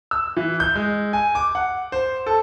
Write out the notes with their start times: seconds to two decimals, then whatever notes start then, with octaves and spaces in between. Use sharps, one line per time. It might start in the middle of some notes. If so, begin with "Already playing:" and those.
0.11 E6
0.37 E3
0.60 G6
0.75 G#3
1.13 G#5
1.35 D6
1.55 F#5
1.92 C5
2.26 A4